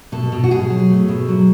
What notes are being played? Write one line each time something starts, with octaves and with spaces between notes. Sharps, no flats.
B2 A4
B2
F#4
B2 G#4
F#3
A3
B2
F#3